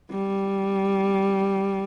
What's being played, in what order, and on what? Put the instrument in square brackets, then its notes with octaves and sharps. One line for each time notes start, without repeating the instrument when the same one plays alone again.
[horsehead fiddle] G3